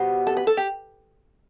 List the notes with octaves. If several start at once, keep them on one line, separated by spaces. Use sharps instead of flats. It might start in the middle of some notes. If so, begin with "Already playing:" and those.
Already playing: B2 G3 B3 C5
A4
B4
A4
G4